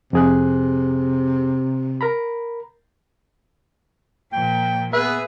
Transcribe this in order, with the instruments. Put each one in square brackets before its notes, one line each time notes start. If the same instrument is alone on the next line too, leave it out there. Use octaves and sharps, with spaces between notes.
[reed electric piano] F2 G#4 F#6 [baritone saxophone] C3
[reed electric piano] A#4 A#5 B5
[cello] A#2 F3 [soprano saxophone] G5
[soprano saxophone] B3 [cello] G#4 [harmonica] B4 [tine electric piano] E5